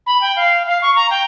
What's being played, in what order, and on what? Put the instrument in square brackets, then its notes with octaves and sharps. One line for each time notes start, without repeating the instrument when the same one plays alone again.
[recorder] B5
G5
F5
F5
C#6
A#5
G5